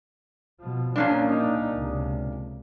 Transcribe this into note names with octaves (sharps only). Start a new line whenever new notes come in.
B2 F3
A#2 F3 A#3 C#4 D4
D#4
C#2 C3